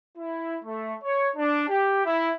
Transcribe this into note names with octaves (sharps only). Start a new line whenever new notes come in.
E4
A3
C#5
D4
G4
E4